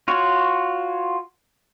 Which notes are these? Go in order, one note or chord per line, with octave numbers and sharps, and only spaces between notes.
F4 F#4 C#5